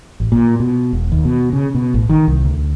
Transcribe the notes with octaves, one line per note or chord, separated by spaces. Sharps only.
A1
A#2
B2
E1
D#2
B2
C#3
B2
A1
D#3
C2
D2